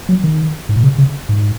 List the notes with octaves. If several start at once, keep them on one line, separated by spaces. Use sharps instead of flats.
F#3
D#3
G#2
A#2
C#3
C#3
G#2